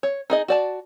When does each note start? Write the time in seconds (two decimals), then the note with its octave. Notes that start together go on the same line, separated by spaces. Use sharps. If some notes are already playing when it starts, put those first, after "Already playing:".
0.03 C#5
0.30 D#4 G#4 D#5
0.48 F#4 D5 A5